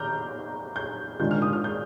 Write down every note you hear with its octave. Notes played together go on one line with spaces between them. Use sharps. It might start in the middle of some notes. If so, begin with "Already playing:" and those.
Already playing: D#3 A#5 D6 F6 G6
G6
G#2 D#3 G#3 D4 F4 G6
F6
D#6
F6
G6